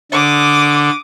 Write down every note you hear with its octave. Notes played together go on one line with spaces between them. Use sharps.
D3 D6 D#6